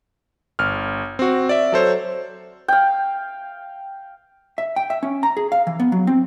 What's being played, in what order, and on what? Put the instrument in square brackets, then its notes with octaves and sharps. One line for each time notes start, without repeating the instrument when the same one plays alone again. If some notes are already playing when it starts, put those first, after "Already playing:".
[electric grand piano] G1 F6
C4 F#4
D5 E5
F#3 A4 C5 C#5
[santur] F5 G5
[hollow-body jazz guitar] E5
G5
E5
C#4
A#5
G#4
F5
E3
B3
F#3
C4